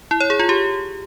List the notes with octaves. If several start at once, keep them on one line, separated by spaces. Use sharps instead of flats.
E4
C#5
G#4
F4
G4